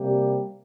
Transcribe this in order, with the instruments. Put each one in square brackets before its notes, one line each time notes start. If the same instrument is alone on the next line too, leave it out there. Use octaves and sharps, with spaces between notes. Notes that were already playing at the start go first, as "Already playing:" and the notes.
Already playing: [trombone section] C3 G3 A#3 G4